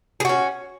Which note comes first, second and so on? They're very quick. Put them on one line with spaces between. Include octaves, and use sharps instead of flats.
G#4 F#4 C#4